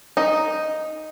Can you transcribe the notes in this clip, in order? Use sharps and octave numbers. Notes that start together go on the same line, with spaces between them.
D#4